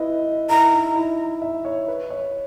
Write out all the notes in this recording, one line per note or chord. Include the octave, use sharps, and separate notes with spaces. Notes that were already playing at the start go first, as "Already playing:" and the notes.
Already playing: E4 B4 D#5
E4 A#5
D#4
E4
E5
C#5
B4
C#5